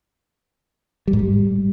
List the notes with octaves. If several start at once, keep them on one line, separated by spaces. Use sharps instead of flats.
G3
G#2
G3